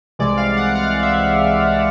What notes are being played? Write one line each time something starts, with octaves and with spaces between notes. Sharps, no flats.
C2 C3 E3 G#3 D5
F5
F#5
F5
E5